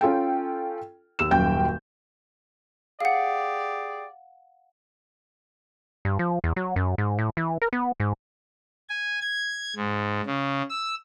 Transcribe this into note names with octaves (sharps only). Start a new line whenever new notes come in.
C#4 F4 A4 G5
D#2 E6 E7
D#1 F#2 G5 G6
G4 G#4 D5 F5 F#5
G2
F3
E2
F#3
F#2
G#2
A2
E3
A#4
B3
G#2
G#5
G#6
G#2
C#3
E6